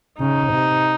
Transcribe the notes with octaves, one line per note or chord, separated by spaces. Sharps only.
C#3 D#4
C3